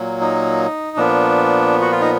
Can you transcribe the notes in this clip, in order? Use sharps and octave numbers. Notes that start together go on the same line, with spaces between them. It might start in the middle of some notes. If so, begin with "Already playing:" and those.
Already playing: A#2 F#3 A#3
D#4
A#2 F3 B3 D4
F#4
F4
D#4